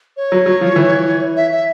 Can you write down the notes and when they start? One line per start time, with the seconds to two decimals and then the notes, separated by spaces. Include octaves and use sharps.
0.17 C#5
0.32 F#3
0.46 F#3
0.61 F3
0.76 E3
1.36 E5
1.51 E5